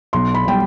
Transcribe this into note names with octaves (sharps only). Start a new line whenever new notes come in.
B1 C6
B5
B2 G3 G5